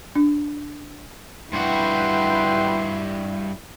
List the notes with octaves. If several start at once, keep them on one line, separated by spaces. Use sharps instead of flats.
D4
G2 E4 F#4 B4 G5 C6